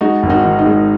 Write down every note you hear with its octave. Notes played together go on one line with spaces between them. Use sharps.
G#3 D#4 F#4
G#1
D#4 F#4
D#3
D#4
G#3